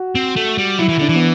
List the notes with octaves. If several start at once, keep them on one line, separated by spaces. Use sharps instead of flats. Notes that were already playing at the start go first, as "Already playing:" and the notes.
Already playing: F#4
C4
A3
G3
F#3 E4
E3
D3 D4
E3
B3